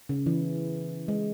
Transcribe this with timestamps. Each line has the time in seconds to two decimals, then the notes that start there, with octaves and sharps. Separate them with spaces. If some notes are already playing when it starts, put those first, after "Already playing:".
0.09 C#3
0.26 E3
1.08 G#3